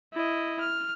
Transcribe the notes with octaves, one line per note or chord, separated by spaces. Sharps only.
E4 D#5
F6